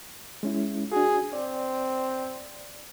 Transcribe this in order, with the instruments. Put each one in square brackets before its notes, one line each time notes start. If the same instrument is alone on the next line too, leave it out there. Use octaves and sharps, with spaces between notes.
[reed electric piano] G#3 C#4 E4
[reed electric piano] D4 F#4 [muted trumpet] G#4
[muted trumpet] C4 [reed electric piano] D5